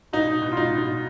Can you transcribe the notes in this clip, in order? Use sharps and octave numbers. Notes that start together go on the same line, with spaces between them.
B2 D#4
B2
F4
D#4
B2